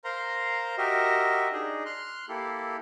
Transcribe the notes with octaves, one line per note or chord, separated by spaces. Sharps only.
A#4 C5 F5 A#5 C6
F#4 G4 A#4 D#5 E5
D4 D#4 G#4 D#5
C6 F6 F#6
A#3 E4 G4 A4